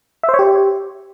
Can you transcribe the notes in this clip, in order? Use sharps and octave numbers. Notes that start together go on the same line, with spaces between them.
E5
C5
C#5
G4